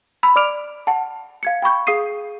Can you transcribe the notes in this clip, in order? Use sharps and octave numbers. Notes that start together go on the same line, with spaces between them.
A#5 B5 E6 B6
D5 D6 F6 D7 F7
F#5 A5
F5 G#6 C#7
G5 B5 C#6 G6
G#4 F5 D#6 C7 D#7